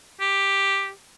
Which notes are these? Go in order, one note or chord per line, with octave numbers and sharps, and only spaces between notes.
G4